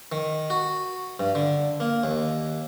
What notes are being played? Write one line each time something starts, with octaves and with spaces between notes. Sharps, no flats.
D#3
F#4
G2
D3
A#3
D#2